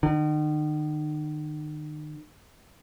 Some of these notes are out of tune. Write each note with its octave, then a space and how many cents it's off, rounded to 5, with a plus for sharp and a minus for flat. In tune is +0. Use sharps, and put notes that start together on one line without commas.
D#3 -40